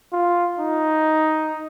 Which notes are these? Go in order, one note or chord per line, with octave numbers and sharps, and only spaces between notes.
F4
D#4